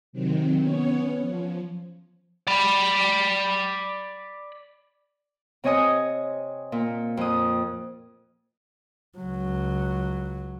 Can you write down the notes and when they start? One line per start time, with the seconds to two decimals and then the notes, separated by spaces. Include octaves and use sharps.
0.13 C3 D#3 F#3 C4
0.60 B3 C#4 C#5
1.22 F3
2.47 D5 B5
5.64 C3 C4 C#5 D#5 G#5 D#6
6.72 A#2
7.17 F2 D#6
9.18 C#2 F#3